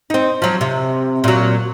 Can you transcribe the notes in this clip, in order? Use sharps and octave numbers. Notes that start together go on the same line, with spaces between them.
C4 D#4
F3 F#3
C3
A#2 F#3